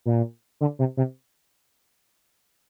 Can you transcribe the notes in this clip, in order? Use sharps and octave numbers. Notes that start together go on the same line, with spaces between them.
A#2
D3
C3
C3